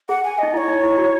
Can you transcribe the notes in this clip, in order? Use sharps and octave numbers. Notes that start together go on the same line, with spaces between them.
G#4 F#5
G#5
D#4 D#5
E4 D#5
C#5
D#4
E4
F#4